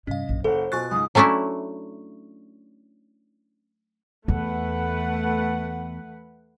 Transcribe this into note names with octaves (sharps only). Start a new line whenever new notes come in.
G2 C3 C#4 D#5 F5
A#1 F#2
F#1 E4 A4 C5 F#5
B2 F4 G#5 C#6 F#6 A6
C#2 G#2 G#5 D#6
F#3 A3 C#4 D4 E4
E2 A3 B4 F#5